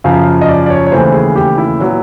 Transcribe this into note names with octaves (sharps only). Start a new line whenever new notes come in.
F#2 C#3 F3 F5
D#5
D5
D5
C#5
C#5
D#2 C#3 E3 A3 C5
G#4
G4
E4
A#2 F#3 B3